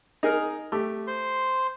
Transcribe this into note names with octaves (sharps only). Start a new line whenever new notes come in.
D#4 G#4 A#4
A3 G4
C5 C6